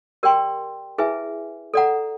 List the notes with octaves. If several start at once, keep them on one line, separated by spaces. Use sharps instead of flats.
G4 A#4 D5 G5 C6
E4 G#4 B4 E5 G#5
A4 D5 F#5 A#5